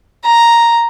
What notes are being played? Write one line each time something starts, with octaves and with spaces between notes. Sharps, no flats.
A#5